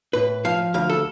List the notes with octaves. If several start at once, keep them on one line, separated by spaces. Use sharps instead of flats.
A2 B4
F3 F5
D2 F5
A4